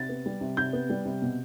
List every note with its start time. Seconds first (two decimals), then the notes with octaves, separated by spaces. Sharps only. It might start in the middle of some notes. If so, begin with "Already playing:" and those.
Already playing: C3 A6
0.09 B3
0.26 G3
0.41 C3
0.57 C3 G6
0.73 B3
0.90 G3
1.05 C3
1.22 B2